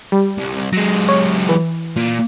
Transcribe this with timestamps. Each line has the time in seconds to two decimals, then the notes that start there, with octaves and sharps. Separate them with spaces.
0.12 G3
0.38 C2
0.73 F#3 G#3 A#6
1.08 C#5
1.49 E3
1.97 A#2